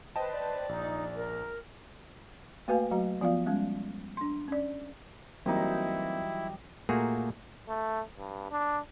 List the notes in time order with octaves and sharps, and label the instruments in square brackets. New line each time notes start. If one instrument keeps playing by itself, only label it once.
[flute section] B4 C5 [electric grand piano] D#5 G5 A5
[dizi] D5
[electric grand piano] A#1 [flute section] D#4
[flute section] A#4
[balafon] A3 A#3 F#4 B4 F5 G#5
F#3 A3 F#4 A#5
F3 B3 F4 D5 F5
G3 G#3 C#4
D4 C6
C#4 D5
[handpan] E3 F#3 G3 [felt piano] A#3 C4 [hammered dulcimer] D#4 G4 [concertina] E4
[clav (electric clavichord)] A#2 A3 A#3 F#4 G#4
[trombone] A3
G2
D4